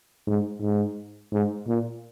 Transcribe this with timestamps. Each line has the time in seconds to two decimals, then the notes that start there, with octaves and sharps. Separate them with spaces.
0.27 G#2
0.61 G#2
1.32 G#2
1.68 A#2